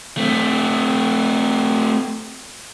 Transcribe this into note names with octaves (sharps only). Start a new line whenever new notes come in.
A3 C4